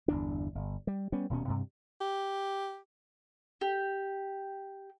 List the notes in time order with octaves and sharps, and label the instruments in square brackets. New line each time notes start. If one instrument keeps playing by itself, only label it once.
[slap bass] G1 E2 D4
G1
G3
G3 B3 C#4
D#1 B2 B3 C#4
G2 C3
[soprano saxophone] G4
[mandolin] G4